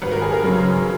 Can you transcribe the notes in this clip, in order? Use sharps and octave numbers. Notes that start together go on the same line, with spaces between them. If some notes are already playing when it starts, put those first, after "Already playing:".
G#1 B4
A#4
G#4
A#4
F#2 C#3